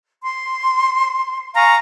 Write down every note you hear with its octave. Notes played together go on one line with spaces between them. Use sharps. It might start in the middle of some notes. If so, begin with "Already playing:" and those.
C6
F5 G#5 A#5 C#6